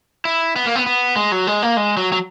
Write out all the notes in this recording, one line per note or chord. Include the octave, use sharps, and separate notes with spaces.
E4
B3
A#3
B3
B3
G#3
F#3
G#3
A#3
G#3
F#3
F#3